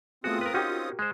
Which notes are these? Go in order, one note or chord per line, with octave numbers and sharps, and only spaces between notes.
A3 B3 C4 F4 F#4 G#4 D#6
A#4 B4
C#4 D#4 F#4 G4 A#4
G#3 C5